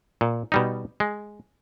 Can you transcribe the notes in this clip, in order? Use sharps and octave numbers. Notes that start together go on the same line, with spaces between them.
A#2
B2 G3 D#4
G#3